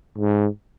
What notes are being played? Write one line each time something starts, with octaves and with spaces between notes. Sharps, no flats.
G#2